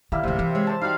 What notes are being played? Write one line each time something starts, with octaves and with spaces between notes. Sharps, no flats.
D#3 G3 A#3 E4
G#1 D2 C3
E3
G#3 C#5
C5 A5
G3 D#4 F#4 F5